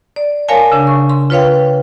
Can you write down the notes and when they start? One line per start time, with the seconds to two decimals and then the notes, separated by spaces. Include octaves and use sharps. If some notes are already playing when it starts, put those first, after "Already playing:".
0.16 D5
0.48 A#4 C#5 F5 G#5 A5
0.72 C#3 D4
0.87 C#6
1.10 C6
1.30 F4 B4 C#5 F5 G5